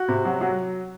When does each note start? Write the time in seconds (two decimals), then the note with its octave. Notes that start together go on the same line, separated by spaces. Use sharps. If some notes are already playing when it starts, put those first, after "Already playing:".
Already playing: F#4
0.08 C3
0.25 F#3
0.41 F#3